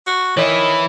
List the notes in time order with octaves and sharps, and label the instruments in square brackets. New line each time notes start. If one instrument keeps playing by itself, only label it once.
[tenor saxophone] F#4
[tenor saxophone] D#3 [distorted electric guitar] E3 E4 [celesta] C#5